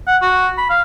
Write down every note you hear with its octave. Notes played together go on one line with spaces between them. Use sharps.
F#5
F#4
B5
F5